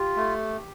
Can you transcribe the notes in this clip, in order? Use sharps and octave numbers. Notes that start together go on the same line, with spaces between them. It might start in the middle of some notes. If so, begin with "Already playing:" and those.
Already playing: F4 G4
A3